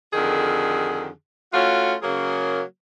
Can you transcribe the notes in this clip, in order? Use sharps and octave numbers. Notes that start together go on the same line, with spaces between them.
F2 D3 D#3 G4 G#4
A3 C#4 F4 F#4
C#3 F#3 A#3 G#4 A#4